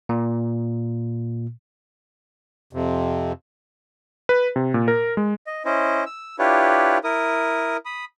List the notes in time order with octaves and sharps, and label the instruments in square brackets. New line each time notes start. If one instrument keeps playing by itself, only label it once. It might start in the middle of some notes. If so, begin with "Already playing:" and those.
[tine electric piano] A#2
[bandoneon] F2 C3
[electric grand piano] B4
C3
A#2
A#4
G#3
[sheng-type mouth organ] D#5
C#4 E4 C5 D#5
E6
D4 E4 F4 G4 B4 C#5
E4 A#4 D#6
B5 D#6